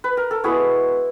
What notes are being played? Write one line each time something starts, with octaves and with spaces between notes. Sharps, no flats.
B4
A#4
A4
G#3 B3 E4 F#4 G#4